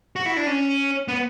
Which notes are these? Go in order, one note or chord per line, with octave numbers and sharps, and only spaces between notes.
F#4
E4
D4
C#4
B3